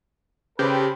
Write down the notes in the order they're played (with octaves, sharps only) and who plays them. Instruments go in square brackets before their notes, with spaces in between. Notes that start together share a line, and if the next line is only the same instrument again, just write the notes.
[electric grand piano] C#3 [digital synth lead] G4 [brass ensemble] A4 B4 [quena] C5